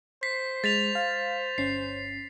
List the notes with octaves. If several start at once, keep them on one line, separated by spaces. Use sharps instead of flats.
C5 B6 C7
G#3 A6 B6 F7
F5
G1 C#4 C7